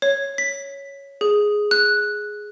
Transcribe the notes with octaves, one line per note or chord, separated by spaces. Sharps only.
C#5
B6
G#4
F#6